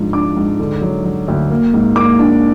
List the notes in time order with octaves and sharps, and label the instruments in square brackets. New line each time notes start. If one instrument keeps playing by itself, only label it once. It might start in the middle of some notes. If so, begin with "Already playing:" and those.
Already playing: [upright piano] G#2 F3 D4
D4 D6
G#2
D3
F#3
F#3
D2
A#3
G#2
A#3 D6
D4